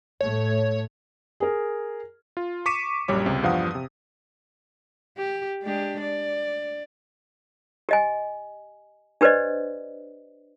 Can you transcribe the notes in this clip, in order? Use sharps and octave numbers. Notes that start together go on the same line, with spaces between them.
A2 A3 C#5
G#4 A#4
F4
C#6 D6 B6 C#7 D#7 E7
A#1 F#2 G3 C#5 D6
C#2 C3
E2 G2 F3 F5 F#5 D#6
C3 D#6
G4
G#3 D4 G4
D5
G4 D#5 G#5
D4 G4 B4 C5 D5 D#5